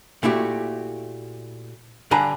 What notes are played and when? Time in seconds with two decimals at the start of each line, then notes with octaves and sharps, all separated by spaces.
0.23 A#2 A3 E4 F#4 G4
2.11 G2 D3 D4 G#5 A#5 B5